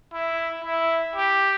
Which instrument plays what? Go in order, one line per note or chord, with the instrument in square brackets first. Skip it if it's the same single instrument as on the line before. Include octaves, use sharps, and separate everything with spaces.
[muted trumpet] E4
E4
G4